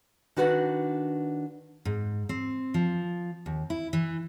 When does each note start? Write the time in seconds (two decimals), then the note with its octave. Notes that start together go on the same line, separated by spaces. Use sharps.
0.36 D#3 D4 F#4 B4 D5 F#5
1.85 G#2
2.29 C4
2.74 F3
3.46 D#2
3.70 E4
3.93 E3